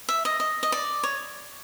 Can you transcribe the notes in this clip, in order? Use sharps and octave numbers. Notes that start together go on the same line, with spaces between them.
E5
D#5
D#5
D#5
D5
C#5